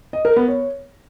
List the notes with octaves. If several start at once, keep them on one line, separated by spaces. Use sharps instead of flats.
D#5
A#4
B3
C#5